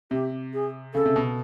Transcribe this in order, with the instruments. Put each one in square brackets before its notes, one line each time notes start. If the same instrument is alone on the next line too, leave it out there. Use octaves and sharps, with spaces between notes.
[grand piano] C3 [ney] G4
[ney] G#4
[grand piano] C#3 [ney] A4
[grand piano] C3
B2